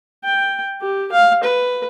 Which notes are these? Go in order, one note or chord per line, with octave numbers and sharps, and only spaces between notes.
G5
G4
F5
B4